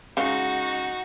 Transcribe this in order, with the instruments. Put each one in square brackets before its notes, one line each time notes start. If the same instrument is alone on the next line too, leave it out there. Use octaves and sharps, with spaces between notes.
[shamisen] C#3 G#3 [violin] D#4 F#4